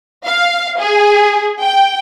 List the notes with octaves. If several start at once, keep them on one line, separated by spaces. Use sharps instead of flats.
F5
G#4
G5